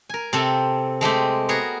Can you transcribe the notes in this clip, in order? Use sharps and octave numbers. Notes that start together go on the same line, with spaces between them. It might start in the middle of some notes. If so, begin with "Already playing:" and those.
A#4 G#5
C3 C4 A4
G#3 A3 C4 G4
B3 F#4 G#4 A#4